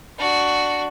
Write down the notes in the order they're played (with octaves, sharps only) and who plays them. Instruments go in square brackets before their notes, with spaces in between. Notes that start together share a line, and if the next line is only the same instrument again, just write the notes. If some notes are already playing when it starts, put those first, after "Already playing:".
[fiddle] D4 F#4